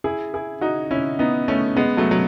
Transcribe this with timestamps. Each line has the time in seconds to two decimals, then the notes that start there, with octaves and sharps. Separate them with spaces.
0.04 E4 G#4
0.34 E4 G#4
0.61 D#4 F#4
0.91 C#4 E4
1.19 B3 D#4
1.48 A3 C#4
1.77 G#3 B3
1.97 F#3 A3
2.11 F#3